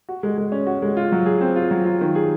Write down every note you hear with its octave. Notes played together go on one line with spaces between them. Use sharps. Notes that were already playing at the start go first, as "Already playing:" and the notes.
F#4
G#3
G#3
C#4
F#4
G#3
F4
F#3
G#4
C4
F4
F#3
F4
D#3
G#4